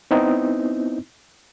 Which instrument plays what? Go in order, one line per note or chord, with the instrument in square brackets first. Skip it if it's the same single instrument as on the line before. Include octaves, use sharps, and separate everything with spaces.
[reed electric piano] B3 C4 D#4 E4